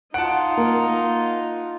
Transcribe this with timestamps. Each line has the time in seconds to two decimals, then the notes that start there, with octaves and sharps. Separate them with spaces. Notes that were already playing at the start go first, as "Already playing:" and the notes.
0.14 D#4 F4 F#5 A5 D7
0.57 A#3